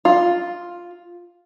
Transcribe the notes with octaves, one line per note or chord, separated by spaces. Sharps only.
F4